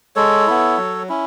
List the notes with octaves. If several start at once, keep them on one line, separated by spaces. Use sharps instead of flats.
G#3 A4 C#5
B3 E4
F#3
C#4 E4